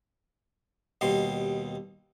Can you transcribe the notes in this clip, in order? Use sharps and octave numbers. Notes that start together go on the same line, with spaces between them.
D#2 B2 G3 C6